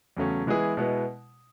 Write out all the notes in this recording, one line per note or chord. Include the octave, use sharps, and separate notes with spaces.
E2 C#3 F#3 A3 C#4
E3 G#3 B3 E4 G#4
B2 G#3 B3 E4